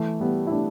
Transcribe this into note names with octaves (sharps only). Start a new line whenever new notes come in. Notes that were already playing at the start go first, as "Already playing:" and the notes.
Already playing: E3 A3
G3 B3
E4
A3 D4